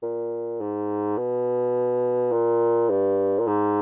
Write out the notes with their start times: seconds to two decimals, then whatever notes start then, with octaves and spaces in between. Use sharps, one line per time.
0.03 A#2
0.60 G#2
1.17 B2
2.32 A#2
2.90 G2
3.39 A#2
3.47 G#2